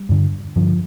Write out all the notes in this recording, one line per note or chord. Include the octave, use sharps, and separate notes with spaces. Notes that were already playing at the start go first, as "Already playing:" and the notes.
Already playing: G3
G2 D3
G2 D3 F3